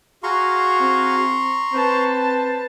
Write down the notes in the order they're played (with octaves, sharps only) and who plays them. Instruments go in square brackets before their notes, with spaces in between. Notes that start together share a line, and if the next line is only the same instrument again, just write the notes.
[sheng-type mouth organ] F#4 G#4 F5 [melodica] A#5 C6 C#6
[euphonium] C4
[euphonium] C4 [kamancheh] B4 A5 [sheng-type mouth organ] C5